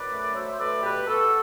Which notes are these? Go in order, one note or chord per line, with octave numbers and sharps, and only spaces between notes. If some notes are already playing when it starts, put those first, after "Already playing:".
Already playing: F#2 B4 D5
A3
F#3 C5 E5
C5
A3 B4 D5
B2 G4 B4
B2 F#4 A4